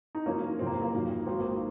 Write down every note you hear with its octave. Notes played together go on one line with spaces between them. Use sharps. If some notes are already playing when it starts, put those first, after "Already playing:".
D#4
F#1 F#2 F3 A#3 C#4
F#1 F2 C3 F3 C4
A#3
A#3
F2 D#3 F#3
G#1 G#2 D#3 F#3 C4
A#3